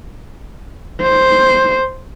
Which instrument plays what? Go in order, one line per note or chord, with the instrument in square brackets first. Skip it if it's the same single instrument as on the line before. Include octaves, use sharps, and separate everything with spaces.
[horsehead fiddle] C5